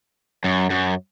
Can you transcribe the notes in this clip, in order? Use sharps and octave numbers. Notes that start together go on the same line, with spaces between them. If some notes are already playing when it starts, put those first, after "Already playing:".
F#2
F#2